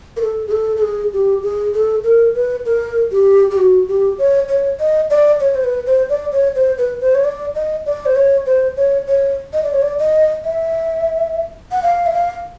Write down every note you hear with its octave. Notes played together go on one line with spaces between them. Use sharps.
A#4
A4
G#4
A4
A4
G#4
G4
G#4
A4
A#4
B4
A#4
G4
G4
F#4
G4
C#5
C#5
D#5
D5
C#5
C5
B4
C5
D5
C#5
C5
B4
C5
C#5
D5
D#5
D5
C5
C#5
C5
C#5
C#5
D#5
D5
C#5
D5
D#5
E5
F#5
F5
E5
F5